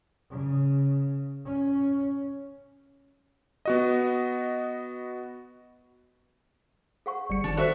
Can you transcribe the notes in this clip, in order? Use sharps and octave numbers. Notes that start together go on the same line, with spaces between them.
C#3
C#4
B3 F#4 D#5
G#4 F#5 C#6
G1 G3 D5 C#7
D#3 F3 D4
F#4 A4 C5 E5 F#6